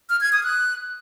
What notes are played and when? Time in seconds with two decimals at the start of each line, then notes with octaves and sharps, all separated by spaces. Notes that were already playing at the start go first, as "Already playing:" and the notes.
0.09 F6
0.21 G#6
0.32 D#6
0.44 F#6